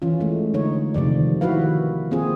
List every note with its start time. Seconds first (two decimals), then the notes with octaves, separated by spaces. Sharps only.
0.02 E3 C#4 F4
0.20 G#3 A3
0.54 D3 D#4 C#5
0.94 C3 D#3 F3 D5
1.41 D#3 E4 F#4 B4 F5
2.11 A#3 C4 F4 G#4